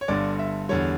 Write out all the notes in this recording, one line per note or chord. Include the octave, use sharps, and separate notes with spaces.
C#5
G1 G2 D3 D5
E5
E2 D3 G3 C#5